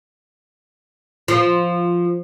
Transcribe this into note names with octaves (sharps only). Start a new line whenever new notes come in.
F3